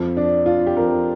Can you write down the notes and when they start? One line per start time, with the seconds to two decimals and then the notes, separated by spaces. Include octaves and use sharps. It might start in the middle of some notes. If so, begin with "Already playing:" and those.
Already playing: F2 F3
0.17 D4
0.46 F4
0.67 G4
0.76 F2 F3 A#4